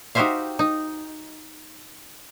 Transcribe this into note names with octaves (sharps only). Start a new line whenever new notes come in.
D#4 F#4 G4 C5 E5 F5
D#4